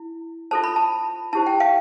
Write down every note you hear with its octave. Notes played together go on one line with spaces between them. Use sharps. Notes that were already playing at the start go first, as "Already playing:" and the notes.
Already playing: E4
F4 A4 C5 A5
B5
A5
E4 G4 C5 A5
G5
F5